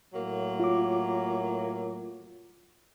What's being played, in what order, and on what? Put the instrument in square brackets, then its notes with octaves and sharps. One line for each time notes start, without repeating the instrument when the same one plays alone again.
[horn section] A2 F#3 A#3
[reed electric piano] F4 D6